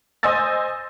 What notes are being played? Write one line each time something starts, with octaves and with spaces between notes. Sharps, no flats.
C5 D#5 G#5 D#6 E6 A6